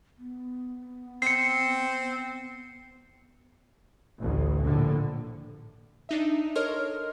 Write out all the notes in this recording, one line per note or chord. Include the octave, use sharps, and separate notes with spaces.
B3
C4 C7 C#7
A1 D2
A#1 A2 D3
D4 D#4 E5
A4 A#4 C#5 D#5 C6 F6